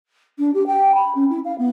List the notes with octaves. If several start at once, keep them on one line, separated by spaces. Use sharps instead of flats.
D4
G4
G5
B5
C#4
E4
F5
B3